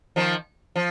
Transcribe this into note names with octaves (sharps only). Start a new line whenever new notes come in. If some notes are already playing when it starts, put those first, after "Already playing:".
D#3 F3
F3